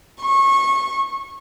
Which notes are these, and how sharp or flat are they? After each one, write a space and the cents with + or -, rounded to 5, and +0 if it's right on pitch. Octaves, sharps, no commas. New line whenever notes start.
C#6 -25